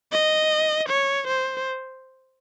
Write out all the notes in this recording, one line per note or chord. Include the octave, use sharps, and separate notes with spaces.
D#5
C#5
C5